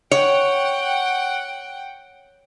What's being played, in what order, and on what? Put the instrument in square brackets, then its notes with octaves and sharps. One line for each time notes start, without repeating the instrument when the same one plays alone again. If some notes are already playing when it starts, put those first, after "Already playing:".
[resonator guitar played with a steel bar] C#5 [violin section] F#5 G5